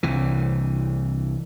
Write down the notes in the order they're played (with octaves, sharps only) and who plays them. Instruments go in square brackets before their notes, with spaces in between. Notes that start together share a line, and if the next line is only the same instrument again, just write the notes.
[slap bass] C2 E3